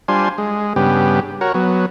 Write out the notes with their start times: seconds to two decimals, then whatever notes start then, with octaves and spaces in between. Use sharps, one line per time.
0.08 G3 D4 F4 C5 G#5 C6
0.38 G#3
0.76 G2 C#3 B3 G4
1.41 F#4 A#4 C#5
1.54 F#3 B3